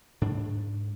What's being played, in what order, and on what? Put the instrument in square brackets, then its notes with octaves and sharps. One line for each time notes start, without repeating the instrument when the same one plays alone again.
[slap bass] G#2 D4